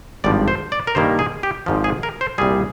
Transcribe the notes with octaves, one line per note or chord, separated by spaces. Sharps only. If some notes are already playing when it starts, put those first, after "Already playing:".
G#1 G2 F3 D5
C5
D5
A#4
G2 D#3 G3 A#3 C5
G#4
G4
G#1 G#2 F3
G#4
A#4
C5
C2 A#2 G3 G#4